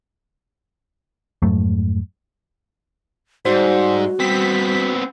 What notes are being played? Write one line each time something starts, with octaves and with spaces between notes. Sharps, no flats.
F2 G#2 F#3 A3
G#2 G3 F#4 C5 D5 E6
G3 B3 C4 B6